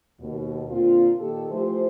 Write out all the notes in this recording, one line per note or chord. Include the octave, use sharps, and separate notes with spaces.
D#2 B2
A#2 D3 C4 F4
A#2 D#3 G4 A4
E3 F3 A3 G4 C5